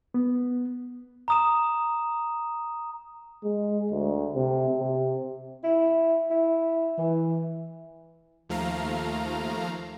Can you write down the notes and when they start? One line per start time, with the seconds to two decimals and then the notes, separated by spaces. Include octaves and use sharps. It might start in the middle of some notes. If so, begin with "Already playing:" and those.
0.14 B3
1.28 A#5 D#6 E7
3.44 G#3
3.92 D2
4.36 C3
4.80 C3
5.63 E4
6.30 E4
6.98 E3
8.49 D#2 F3 A3 F5 A#5